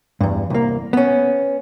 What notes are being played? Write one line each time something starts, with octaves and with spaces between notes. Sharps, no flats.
E2 G2
C2 A#3
B3 C#4